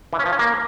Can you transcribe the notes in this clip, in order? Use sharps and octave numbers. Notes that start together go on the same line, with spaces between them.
E3
C#4
F3
C#4
A#3